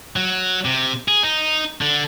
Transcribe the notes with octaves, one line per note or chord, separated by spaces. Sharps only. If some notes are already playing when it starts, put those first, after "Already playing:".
F#3
C3
G#4
D#4
D3